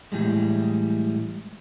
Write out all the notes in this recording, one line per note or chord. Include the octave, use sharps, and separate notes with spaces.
A2 E3 G3 G#3